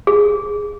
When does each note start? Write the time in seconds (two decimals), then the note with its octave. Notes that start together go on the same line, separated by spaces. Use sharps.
0.07 G#4